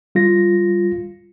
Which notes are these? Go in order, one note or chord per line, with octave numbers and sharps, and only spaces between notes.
G3 F4 A#6